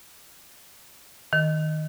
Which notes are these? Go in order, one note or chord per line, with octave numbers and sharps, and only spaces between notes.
D#3